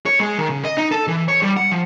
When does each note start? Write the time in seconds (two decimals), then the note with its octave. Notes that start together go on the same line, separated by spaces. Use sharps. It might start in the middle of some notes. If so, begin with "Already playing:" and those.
0.06 C#5
0.20 G#3
0.38 D#3
0.50 C#3
0.65 D#5
0.77 D#4
0.92 A4
1.07 E3
1.28 C#5
1.42 G3
1.57 F#5
1.72 F3